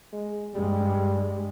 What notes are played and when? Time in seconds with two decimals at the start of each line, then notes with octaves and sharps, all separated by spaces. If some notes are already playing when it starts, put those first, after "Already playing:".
0.13 G#3
0.54 G2 G3 G#3